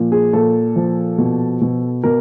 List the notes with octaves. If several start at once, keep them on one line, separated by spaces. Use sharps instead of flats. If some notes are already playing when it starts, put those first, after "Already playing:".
Already playing: A#2 F3
G#4
A#2 A4
F3
B2
B2
B2 A#4